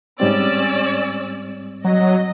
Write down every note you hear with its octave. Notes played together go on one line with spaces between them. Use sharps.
G#2 G3 C4 C#4 D5 E6
F#3 D#5